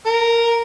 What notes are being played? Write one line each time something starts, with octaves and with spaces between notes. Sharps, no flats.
A#4